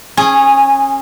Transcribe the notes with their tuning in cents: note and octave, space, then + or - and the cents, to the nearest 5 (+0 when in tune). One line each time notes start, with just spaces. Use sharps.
C#4 -20 G#4 +0